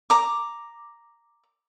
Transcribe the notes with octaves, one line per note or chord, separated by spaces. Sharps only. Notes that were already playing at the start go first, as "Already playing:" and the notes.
A#5 D6